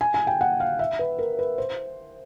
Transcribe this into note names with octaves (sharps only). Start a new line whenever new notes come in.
G#5
G#5
G5
F#5
F5
E5
B4
A#4
B4
C5